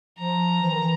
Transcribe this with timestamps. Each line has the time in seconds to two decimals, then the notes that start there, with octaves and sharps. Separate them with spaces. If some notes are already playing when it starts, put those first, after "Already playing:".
0.19 F3 A#5
0.62 E3
0.72 D#3
0.80 E3